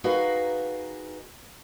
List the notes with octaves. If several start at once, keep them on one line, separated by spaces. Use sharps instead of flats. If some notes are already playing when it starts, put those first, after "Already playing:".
D#4 F#4 G#4 A#4 B4 F5